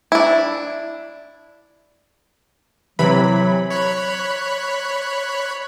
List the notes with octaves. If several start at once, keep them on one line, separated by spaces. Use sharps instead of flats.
D4 E4
C3 E3 F#3 B5
C#5 B5 F#6